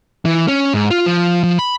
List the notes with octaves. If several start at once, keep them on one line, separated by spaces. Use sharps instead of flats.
E3
C#4
G#2
F4
F3
F3
B5